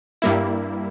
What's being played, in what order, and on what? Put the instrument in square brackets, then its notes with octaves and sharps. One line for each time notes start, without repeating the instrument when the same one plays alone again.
[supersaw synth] G2 G3 A#3 E4